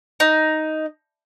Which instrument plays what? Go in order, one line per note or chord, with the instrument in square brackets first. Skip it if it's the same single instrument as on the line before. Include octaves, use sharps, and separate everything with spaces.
[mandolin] D#4